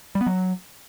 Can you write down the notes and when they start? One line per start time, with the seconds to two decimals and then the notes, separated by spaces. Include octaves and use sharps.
0.15 G3
0.21 B3
0.26 F#3